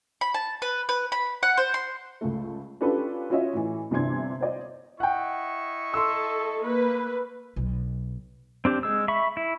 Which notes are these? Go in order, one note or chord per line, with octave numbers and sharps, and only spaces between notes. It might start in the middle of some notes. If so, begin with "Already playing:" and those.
B5
A5
B4
B4
B5
F#5
C5
C6
C#2 A3
C#4 D4 F4 G4 A4 B4
C#4 F4 F#4 C#5 D#5 E5
A2 E3
G1 C3 E3 D4 C6 G#6
C5 D5 D#5
E4 D#5 F#5 G5 C#6
A4 C6 E6
A#3 B4
B1
C4 D4 G4
G#3 E6
E5 B5 C#6
E4